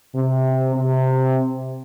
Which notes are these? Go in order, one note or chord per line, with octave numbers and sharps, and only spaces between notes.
C3
C3